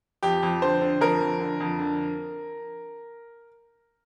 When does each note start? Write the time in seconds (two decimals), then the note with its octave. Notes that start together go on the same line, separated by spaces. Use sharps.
0.23 F2 G4
0.43 F2
0.62 D3 C5
0.81 D3
1.01 F2 A#4
1.21 F2
1.40 D3
1.60 F2
1.79 D3